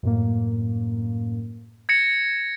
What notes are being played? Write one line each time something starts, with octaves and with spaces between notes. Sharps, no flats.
F#2 A2 A#3
G#6 A#6 C#7 E7